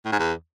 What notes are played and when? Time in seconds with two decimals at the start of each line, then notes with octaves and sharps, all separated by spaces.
0.05 A2
0.12 G#2
0.19 E2